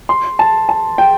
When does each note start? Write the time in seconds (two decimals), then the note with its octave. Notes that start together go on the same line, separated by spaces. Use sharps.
0.09 C6
0.39 A5
0.69 A5
0.98 G5